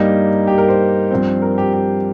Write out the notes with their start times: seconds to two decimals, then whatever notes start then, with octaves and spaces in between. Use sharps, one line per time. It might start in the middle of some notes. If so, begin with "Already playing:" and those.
Already playing: G2 G3 A#3 D#4
0.47 G4
0.58 A#4
0.68 C5
1.11 G2 F3 C4
1.42 A#4
1.58 G4
1.73 G4